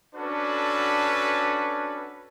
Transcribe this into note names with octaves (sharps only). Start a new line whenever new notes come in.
C#4 D4 F#4 A4 B4